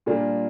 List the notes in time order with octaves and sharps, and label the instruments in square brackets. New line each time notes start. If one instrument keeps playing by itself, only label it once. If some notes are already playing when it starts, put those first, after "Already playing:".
[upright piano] A#2 G3 A#3 D4 F4